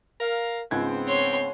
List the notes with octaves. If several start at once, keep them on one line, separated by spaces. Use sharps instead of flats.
A#4 F5
C#2 G#2 B3 C4 G#6
C#5 C6